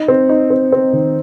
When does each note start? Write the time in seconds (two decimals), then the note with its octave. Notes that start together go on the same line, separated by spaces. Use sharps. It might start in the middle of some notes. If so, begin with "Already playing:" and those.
Already playing: D#4
0.08 C4
0.29 D#4
0.50 C4
0.73 C4
0.93 D#3